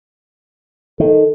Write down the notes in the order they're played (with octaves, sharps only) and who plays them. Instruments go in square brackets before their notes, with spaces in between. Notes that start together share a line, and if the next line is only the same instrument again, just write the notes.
[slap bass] D#3 [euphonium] A4